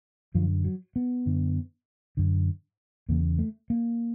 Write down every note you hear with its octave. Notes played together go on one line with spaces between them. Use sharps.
F#2 D3 F3
F#3
B3
F#2 D3
F#2 D3
E2 C#3 A#3
A3
A#3